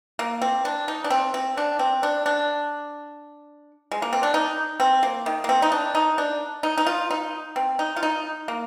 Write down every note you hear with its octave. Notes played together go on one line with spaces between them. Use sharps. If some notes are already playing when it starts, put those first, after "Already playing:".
A#3
C4
D4
D#4
D4
C4
C4
D4
C4
D4
D4
G#3
A#3
C4
D4
D#4
C4
A#3
D#3
A#3
C4
D#4
D4
D#4
D4
D#4
D#4
F4
D#4
C4
D#4
F4
D#4
A#3